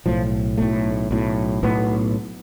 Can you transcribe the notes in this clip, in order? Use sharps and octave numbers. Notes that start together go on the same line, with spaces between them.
B1 A2 F3
B1 A2 A3
B1 A2
B1 A2 B3